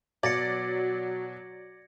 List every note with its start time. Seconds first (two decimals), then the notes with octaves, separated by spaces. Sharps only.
0.23 B2 F#3 D5 G#6 A#6 C#7